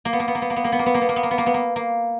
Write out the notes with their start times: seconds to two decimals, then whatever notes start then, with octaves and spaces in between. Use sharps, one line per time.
0.05 A#3
0.13 B3
0.20 A#3
0.28 B3
0.35 A#3
0.42 B3
0.50 A#3
0.56 B3
0.64 A#3
0.72 B3
0.79 A#3
0.86 B3
0.94 A#3
1.01 B3
1.09 A#3
1.16 B3
1.23 A#3
1.31 B3
1.38 A#3
1.46 B3
1.54 A#3
1.76 A#3